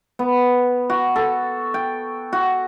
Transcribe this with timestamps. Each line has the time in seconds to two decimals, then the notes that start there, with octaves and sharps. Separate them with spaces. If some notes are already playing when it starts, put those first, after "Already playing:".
0.19 B3
0.90 F#4
1.16 A4
1.74 G5
2.33 F#4